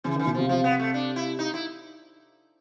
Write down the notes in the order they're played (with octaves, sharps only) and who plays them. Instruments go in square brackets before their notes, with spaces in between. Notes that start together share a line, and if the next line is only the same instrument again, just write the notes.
[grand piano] C#3 [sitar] E3
[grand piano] D#3 [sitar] E3
[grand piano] B2
[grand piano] C3 [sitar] F3
[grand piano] C3 [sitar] F3
[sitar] B3
A3
D4
E4
D#4
E4